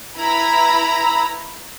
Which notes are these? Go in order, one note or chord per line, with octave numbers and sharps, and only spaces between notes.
E4 B4 A#5 B5